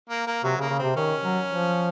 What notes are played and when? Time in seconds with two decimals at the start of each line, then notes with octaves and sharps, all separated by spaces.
0.10 A#3
0.27 A#3
0.44 C3 F#3
0.57 C#3
0.61 A#3
0.69 C#3
0.79 C3 C4
0.96 D#3 C#4
1.22 F#3
1.47 F3